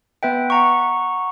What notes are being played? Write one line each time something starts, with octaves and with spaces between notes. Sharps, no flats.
B3 B4 E5 G5
F#5 A#5 C#6